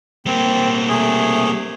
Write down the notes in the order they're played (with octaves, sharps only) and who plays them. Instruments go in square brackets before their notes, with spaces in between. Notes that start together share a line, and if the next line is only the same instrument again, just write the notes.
[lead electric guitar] G3 A#3 [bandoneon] C4
[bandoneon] C3 A3 G#4